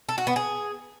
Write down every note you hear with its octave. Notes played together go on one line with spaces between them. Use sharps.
A4
F#4
B3
G#4